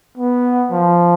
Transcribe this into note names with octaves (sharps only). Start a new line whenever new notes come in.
B3
F3